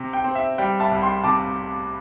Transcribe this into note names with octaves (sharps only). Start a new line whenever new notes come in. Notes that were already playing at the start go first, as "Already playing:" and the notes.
Already playing: C3
G5
C4
E5
G3 G5
E5 A5
C2
G5 C6
C3 A5 D6